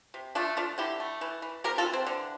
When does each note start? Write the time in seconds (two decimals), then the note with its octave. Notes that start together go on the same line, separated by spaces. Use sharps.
0.14 C3
0.35 A3 D4 F4
0.57 A3 D4 F4
0.78 D3 E4 G4
1.00 A3
1.21 E3
1.42 E3
1.64 C3 G4 A#4
1.78 F4 A4
1.86 E3
1.93 C4
2.07 D3